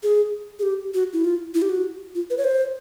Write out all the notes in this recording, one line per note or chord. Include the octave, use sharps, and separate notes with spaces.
G#4
G#4
G4
F#4
E4
F4
E4
G4
F#4
F4
B4
C#5
C5